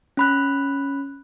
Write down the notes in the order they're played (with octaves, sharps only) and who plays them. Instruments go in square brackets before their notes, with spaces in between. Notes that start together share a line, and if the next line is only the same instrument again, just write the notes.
[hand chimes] C#4 B5 F#6